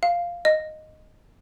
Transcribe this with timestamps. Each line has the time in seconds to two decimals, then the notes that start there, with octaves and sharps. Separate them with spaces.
0.03 F5
0.45 D#5